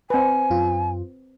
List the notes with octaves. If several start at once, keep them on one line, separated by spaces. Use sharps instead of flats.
C4 B4 G#5
F#2 F4